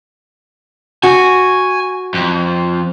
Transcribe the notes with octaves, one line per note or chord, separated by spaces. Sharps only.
F#4 G#5
F2